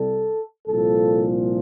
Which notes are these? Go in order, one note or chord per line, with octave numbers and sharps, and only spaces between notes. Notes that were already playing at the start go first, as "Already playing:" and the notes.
Already playing: C2 C3 G3 A4
C2 A#2 F3 A4